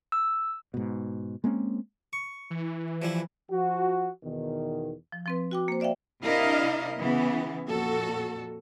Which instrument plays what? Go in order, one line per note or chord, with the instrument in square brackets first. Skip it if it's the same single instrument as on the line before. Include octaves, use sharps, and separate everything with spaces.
[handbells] E6
[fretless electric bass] G#2 B2
G#3 A#3 C4 C#4
[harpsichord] C#6
[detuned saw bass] E3
[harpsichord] F3 G3 E4
[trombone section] F3 F#4
E2 B2 D#3
[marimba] F3
F3 C4 B4
F#4 G5 D6
A#3 C5
C5 D5 E5 F5 G5
[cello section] C3 D4 E4 A#4 D#5 F5
C#3 E3 B3
F2 A#2 F#4 A4